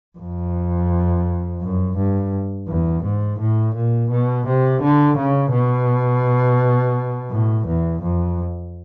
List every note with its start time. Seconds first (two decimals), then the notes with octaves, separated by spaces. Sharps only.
0.18 F2
1.61 F#2
1.97 G2
2.68 E2
3.04 G#2
3.40 A2
3.75 A#2
4.11 B2
4.47 C3
4.82 D3
5.17 C#3
5.53 B2
7.31 A2
7.67 E2
8.03 F2